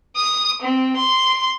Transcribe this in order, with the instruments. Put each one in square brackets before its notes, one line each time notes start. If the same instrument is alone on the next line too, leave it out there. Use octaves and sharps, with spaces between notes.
[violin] D#6
C4
C6